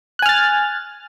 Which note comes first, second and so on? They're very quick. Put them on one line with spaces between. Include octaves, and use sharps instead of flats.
F#6 G#5 F6 A6